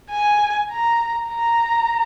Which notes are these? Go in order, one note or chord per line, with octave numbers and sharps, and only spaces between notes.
G#5
A#5
A#5